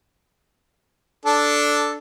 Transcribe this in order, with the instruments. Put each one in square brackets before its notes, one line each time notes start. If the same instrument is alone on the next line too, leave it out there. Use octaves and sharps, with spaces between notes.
[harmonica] D4 A4